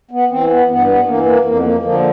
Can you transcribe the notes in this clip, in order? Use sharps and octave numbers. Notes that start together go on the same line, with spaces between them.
B3
E3 C4
B3
G2 B3
B3
E3 A#3
A#3
F2 A#3
B3
A#3
D3 F3 A#3